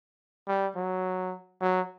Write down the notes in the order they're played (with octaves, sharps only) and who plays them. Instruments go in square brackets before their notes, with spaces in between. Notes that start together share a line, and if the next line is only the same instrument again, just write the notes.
[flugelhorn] G3
F#3
F#3